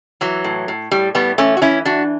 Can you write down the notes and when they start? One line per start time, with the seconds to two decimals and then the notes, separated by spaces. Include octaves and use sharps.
0.21 E3 F#3
0.44 A2
0.68 A2
0.92 A2 G3
1.15 A2 G3 B3
1.38 E3 A3 C#4
1.57 F#4
1.62 E3 C#4 E4
1.85 E3 D4 F#4